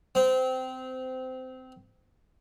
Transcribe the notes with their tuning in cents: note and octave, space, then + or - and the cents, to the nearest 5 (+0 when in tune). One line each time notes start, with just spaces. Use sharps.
C4 -20